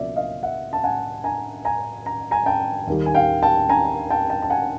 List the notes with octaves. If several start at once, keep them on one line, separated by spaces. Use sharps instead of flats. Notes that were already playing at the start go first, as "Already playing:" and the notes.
Already playing: C#2 B2 F#3 A#3 D5 E5
D#5 F5
E5 F#5
A5
F#5 G#5
G#5 A#5
G#5 A#5
A#5
G#5 A#5
G5 A5
D#2 D#3 G3
G#5
F5 G5
G5 A5
G#5 A#5
G5 A5
G5 A5
A5
F#5 G#5